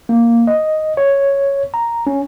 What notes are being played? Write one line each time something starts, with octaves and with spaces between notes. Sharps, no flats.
A#3
D#5
C#5
A#5
C#4